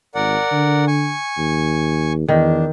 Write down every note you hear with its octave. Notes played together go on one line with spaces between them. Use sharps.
G#1 A#4 D5 F#5
D3
G#5 C#6
D#2
E2 D#3 D4